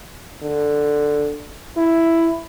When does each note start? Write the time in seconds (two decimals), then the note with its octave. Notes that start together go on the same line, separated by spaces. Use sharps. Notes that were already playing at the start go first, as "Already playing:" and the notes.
0.42 D3
1.77 E4